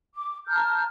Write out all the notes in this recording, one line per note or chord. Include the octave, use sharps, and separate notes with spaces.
D6
A5 A#5 F6 G6